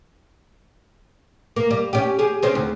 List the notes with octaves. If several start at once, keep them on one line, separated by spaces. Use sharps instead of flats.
A#3
G3
C#4 G4
G4 G#4
G#3 C4 C#4
D2